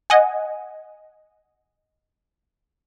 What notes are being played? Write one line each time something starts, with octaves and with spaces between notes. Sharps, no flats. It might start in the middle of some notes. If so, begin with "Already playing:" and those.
D#5 F#5 G#5